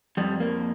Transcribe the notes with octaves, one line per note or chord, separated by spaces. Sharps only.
F2 G3
A#3